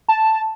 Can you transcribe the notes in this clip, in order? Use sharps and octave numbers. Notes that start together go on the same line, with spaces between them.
A5